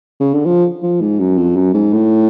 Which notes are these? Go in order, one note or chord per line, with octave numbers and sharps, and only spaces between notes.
C#3
D3
F3
F3
G#2
F#2
F2
F#2
G#2
A2